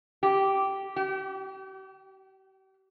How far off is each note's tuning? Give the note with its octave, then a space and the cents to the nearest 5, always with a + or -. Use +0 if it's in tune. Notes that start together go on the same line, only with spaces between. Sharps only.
G4 -10
G4 -40